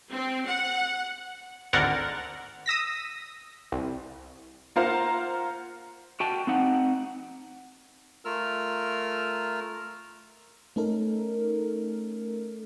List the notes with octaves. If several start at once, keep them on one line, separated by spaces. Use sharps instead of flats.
C4
F#5
G#1 D2 D3 A#4 F#5 A6
D#6 E6 A#6 B6
C2
A#3 F4 C5 F5 F#5 A#5
F#4 G5 A5
C4 D#4 F#5
A3 F4 A#4 E6 F6
A3 C#4 D#4 A4 A#4